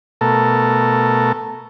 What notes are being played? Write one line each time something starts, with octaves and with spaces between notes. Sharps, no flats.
B2 A3 A4 A#4